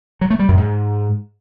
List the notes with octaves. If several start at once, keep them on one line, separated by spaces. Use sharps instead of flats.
F#3
A3
G3
F#2
G#2